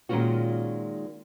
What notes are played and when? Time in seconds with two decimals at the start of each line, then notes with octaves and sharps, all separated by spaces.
0.09 A#2 D#3 G#3 C#4 F4 F#4